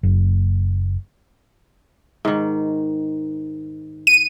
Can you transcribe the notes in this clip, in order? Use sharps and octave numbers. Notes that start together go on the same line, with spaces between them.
F#1
G#2 D#3
D#7